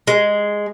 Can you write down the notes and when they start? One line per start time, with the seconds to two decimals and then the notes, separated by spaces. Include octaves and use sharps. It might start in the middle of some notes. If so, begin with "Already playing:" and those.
0.07 G#3